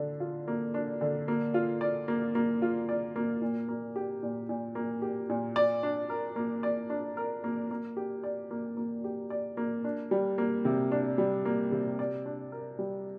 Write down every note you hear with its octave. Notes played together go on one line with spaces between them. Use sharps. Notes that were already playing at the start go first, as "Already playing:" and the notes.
Already playing: D3 D4
F4
A#3
D4
D3
A#3
F4
D5
A#3
A#3
F4
D5
A#3
A#2
A#3
G4
A#2
A#2
A#3
G4
A#2
D5
D4
A#4
A#3
D5
D4
A#4
A#3
A#3
G4
D5
A#3
A#3
G4
D5
A#3
D4
G3
A#3
C3
D4
G3
A#3
C3
D5
D4
A#4
G3